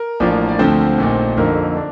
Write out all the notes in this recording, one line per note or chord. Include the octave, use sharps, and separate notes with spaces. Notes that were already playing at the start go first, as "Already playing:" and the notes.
Already playing: A#4
A1 A2 F3 A#3 D4
D5
D2 D3 F3 C4 C5
A#1 A#2 A3 D#4
F2 D3 F3 A#3 D#4 A#4
D4